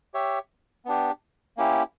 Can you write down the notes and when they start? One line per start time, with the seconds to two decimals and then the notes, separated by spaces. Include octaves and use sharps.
0.14 G4 C#5 E5
0.85 B3 D4 G4
1.57 A#3 C#4 E4 G4